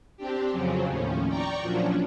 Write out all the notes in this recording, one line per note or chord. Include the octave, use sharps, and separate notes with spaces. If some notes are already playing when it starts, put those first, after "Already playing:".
C4 D4 G4
F2 C#3 F3 F#3 C4 C#4
D#2 A2 F3 C#4
D5 G5 A#5 C#6
A#2 F3 F#3 C#4 D4